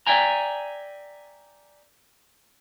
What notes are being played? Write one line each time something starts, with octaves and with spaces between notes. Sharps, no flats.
D5 E5 G5 G#5 A#5